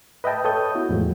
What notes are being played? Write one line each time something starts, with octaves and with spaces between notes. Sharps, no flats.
B4 D#5 E5 G5 A5
A4 C#5 D#6 G6
B3 E4 F#4
E2 A2 F3 G#3